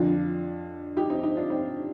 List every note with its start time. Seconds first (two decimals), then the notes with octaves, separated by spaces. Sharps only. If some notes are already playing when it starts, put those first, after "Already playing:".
Already playing: F2 D3 F3 D4 F4
0.97 D#4 G4
1.10 C4 D#4
1.23 C4 D#4
1.37 D4 F4
1.50 C4 D#4